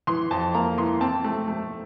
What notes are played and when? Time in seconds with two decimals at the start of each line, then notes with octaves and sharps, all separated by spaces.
0.07 E3 C6
0.31 F2 A5
0.54 A#3 A#5
0.78 E3 C6
1.01 C4 A5
1.24 A3
1.48 A3